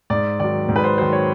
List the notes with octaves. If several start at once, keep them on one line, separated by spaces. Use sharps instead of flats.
G#2 D5
D#3 F#3 D5
G#2
B4
C5
D#3 F#3 C5
C#5